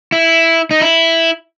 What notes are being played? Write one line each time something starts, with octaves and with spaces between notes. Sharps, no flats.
E4
D#4
E4